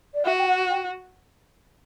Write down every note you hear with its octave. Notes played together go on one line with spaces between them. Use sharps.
D5
F#4 E5
G5
F#5
G5